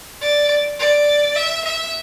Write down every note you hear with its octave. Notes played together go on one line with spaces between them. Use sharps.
D5
D5
E5
E5